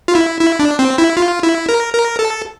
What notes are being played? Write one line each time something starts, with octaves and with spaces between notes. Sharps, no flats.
F4
E4
E4
D4
C4
E4
F4
E4
A#4
A#4
A4